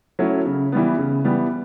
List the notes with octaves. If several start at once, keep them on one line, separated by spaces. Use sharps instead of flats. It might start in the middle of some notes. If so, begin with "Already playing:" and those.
F#3 A3 C#4 E4
C#3
E3 G3 B3
C#3
E3 G3 B3